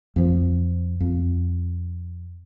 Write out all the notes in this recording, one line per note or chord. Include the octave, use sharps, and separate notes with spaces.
F2 F3
F2